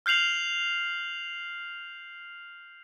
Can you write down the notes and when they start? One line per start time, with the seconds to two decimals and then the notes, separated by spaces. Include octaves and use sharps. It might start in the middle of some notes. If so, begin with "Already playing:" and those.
0.06 F6 G6 C7 F7 F#7